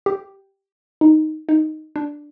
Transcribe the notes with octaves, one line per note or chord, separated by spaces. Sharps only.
G4
D#4
D#4
D4